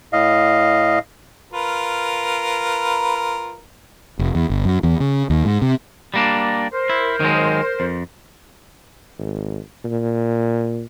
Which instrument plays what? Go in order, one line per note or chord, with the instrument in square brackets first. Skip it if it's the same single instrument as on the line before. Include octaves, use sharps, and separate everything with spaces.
[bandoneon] A2 D#5 F5
[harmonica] F4 A#4 B4
[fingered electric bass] F1
E2
G1
F#2
E2
C#3
D#2
G#2
C3
[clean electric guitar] G3 A#3 D4
[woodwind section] A#4 C5
[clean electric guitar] E4
D#3 F#3 G#3
F2
[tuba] G#1
A#2